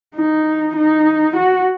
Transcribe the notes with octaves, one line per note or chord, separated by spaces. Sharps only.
D#4
D#4
F#4